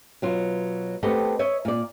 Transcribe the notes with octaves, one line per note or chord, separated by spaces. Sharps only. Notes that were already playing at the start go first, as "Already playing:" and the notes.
B2 F#3 F4
A3 B3 C4 G4 A4 D#5
C#5 D#5 E5
A#2 D5